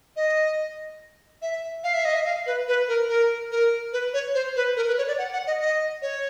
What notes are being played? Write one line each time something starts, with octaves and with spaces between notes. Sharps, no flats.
D#5
E5
F5
E5
D#5
E5
F5
B4
B4
A#4
A#4
A#4
B4
C#5
C5
B4
A#4
B4
C#5
D5
F#5
F#5
D#5
D#5
C#5